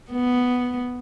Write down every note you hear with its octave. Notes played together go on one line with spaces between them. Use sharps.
B3